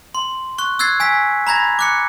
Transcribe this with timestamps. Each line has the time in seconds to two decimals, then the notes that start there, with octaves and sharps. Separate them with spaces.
0.15 C6
0.58 C#6 F#6
0.79 E6 F#6 G#6 A6 C7
1.00 G#5 E6 B6
1.47 A#5 B5 G#6 A#6
1.79 D6 F#6 C#7